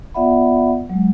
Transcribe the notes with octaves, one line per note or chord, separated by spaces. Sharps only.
B3 F4 D5 E5 F#5 B5
F#3 G#3